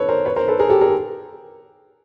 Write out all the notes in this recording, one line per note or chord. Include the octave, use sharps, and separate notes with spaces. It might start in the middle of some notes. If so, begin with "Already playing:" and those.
Already playing: A4 B4 C#5
A#4 C5
B4 C#5
A#4 C5
A4 B4
G#4 A#4
G4 A4
G#4 A#4